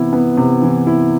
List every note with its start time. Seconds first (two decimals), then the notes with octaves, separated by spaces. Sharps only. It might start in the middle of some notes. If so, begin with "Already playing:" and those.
Already playing: C3 E3 B3 E4
0.13 B3
0.37 C3
0.62 E3
0.87 E4